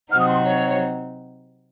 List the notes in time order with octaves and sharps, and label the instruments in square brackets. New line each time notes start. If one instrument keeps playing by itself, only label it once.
[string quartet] C3 F#3 C4 D#4 F#4 [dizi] F6
[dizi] D#6
C6
C#5
C#5